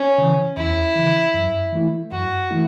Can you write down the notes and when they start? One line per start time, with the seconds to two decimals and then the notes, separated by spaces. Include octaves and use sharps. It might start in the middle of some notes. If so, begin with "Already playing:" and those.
Already playing: C#4
0.18 C#3 E3
0.57 E2 E4
0.96 C#3 E3
1.34 F#2
1.73 E3 A3 E4
2.11 F#2 F#4
2.50 E3 A3 E4